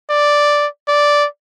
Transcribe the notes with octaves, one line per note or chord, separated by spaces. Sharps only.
D5
D5